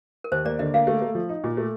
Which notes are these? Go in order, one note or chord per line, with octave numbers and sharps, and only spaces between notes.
A#4
D#2 C5
A#3 D5
D3 D#5
A#3 F5
A3
A3
F3
D#4
A#2
A3